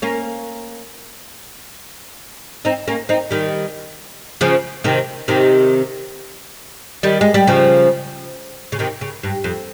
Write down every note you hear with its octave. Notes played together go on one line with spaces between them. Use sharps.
A#3 C#4
C4 D#4
A#3 C#4
C4 D#4
D#3 G3
C#3 F3
C3 D#3
C3 D#3
D#3 G3
G#3
G3
C#3 F3
C#3
C3 D#3
C#3
G2
F2